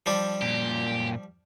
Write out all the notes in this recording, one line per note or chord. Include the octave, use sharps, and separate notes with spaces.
F3 G3 D4
F#2 A#2 G4